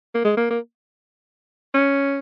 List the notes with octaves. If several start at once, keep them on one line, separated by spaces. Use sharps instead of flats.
A#3
G#3
A#3
A#3
C#4